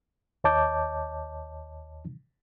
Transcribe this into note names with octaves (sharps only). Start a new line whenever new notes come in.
D#2 C#5 D#5 A5 D6 G6